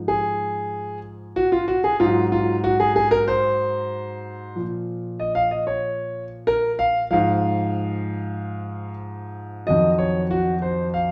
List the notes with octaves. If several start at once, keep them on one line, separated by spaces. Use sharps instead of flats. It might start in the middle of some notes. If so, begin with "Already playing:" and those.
Already playing: G#2 F3
G#4
F#4
F4
F#4
G#4
G#2 F#3 F4
F4
F#4
G#4
G#4
A#4
C5
A#2 F3
D#5
F5
D#5
C#5
A#4
F5
G#2 F3 F5
F2 D#3 F#3 D#5
C#5
F#4
C5
F5